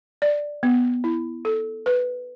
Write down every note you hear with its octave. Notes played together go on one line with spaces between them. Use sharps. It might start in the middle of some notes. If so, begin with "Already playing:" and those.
D5
B3
E4
A4
B4